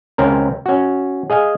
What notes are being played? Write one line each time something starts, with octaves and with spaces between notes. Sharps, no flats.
C#2 C4 C#4 A#4
C#4 F#4
G#4 D#5 F5 G#5